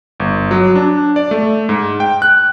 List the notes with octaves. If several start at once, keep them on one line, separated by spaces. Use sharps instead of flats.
G1
F#3
D4
D5
A3
G#2
G5
F#6